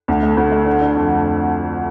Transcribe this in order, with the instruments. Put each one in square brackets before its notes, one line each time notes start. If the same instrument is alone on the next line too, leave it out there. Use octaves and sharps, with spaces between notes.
[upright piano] D2
A3
D2
A3
D3
D3
F2